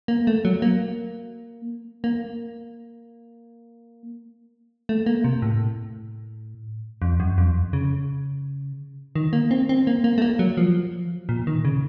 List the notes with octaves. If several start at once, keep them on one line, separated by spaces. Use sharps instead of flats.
A#3
A3
F#3
A#3
A#3
A3
A#3
C3
A2
F2
F#2
F2
C#3
D#3
A#3
C4
C4
A#3
A#3
A3
A#3
F#3
F3
A#2
D#3
C#3